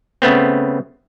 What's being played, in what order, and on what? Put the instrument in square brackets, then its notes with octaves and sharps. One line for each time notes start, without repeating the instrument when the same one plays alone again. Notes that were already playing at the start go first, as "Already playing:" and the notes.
[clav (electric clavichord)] C#3 A3 B3 C4